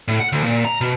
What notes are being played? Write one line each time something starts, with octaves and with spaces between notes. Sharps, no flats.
A2
F#5
D2
A#2
A#5
B2